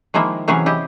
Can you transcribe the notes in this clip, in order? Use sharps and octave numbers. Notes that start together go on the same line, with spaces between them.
D#3 F3 G#3 A#3 E4
C3 E3 F#3 C#4 G#4 F5
E4 G4 D#5